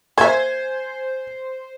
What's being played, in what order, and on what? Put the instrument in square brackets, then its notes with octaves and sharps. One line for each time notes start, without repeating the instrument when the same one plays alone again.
[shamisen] A#3 E5 [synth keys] C5 [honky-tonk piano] G#5 G#6